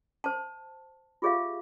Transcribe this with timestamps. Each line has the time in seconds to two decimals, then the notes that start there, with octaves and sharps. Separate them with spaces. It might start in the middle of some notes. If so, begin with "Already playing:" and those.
0.24 C5 A5
1.22 F4 G4 G#4 C#5 E5 F5